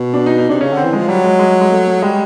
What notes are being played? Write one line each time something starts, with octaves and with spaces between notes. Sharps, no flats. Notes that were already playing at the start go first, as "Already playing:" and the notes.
Already playing: B2
D4
D#4
D#4
C3 D4
C#3 C#4
D3 C4
E3
F3 G#3
F#3 G3
G#3
G#3
G#3
A3
A3
G3 G#3